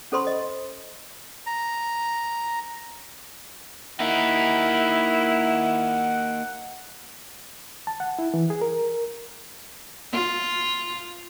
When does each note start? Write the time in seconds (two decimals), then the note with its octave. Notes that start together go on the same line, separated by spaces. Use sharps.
0.12 C#4 A4 C5 B5 C6
0.27 D#5
1.46 A#5
4.00 A#3 D#4 E4 F#5 B5
7.87 A5
8.00 F#5
8.19 E4
8.34 E3
8.50 G#4
8.61 A#4
10.12 F4